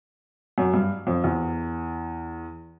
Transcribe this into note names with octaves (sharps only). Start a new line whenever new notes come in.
F#2
G2
F2
E2